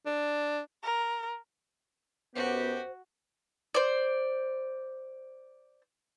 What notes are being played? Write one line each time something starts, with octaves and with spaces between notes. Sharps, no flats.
D4
A#4
F#2 B3 F#4 G4 C5
C5 D5